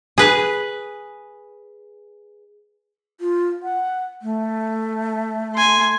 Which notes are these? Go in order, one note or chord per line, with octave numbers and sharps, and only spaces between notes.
G#4 B4
F4
F#5
A3
G#5 C6